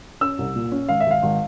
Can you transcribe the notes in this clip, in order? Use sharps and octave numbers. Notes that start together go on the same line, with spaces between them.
C#4 E6
C2
A#2
C#4
G#1 F5
E5
G#1
F5
G#1